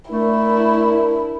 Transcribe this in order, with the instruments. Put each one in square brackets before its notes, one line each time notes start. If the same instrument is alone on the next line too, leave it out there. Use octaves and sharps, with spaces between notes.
[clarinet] A3 [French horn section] D4 A#4 [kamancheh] E4